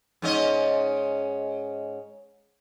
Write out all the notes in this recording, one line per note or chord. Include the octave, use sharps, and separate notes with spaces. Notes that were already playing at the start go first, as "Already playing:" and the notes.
G#2 C#4 D#5